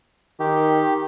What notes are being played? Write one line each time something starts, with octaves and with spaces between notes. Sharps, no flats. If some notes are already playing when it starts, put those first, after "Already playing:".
D#3 G4